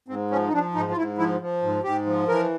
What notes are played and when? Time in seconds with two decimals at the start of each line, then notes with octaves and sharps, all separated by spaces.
0.08 G#2 C4
0.30 F3 C#4
0.48 D#4
0.52 F3 D4
0.74 G#2 D#4
0.91 F4
0.97 G#2 E4
1.18 F3 E4
1.40 F3
1.62 G#2
1.84 G#2 G4
2.06 F3
2.28 E3 A#4